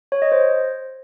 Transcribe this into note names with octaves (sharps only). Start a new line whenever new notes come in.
C#5
D#5
C5